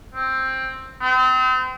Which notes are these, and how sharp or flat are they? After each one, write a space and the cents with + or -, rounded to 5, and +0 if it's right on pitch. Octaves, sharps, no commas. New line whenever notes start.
C4 +10
C4 -35